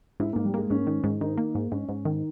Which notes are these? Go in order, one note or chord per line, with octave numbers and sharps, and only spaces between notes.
G#2 E4
G#2 A#3
G3
G#3 A#3
G#2 C#4
D#3
G#2
D#3 D#4
A#3
G#2
G#2 C#4
G#2
D#3